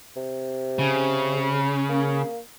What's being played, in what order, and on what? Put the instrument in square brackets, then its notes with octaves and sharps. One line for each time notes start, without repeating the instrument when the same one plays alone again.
[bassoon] C3
[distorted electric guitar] C#3
[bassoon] A#3